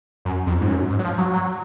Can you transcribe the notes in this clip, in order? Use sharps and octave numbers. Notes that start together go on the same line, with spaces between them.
F#2
F2
G#2
F#2
G#2
F#3
F3
F#3
F#3